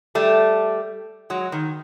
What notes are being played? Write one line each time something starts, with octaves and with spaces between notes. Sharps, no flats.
G3 A3
F#3 G#3
D#3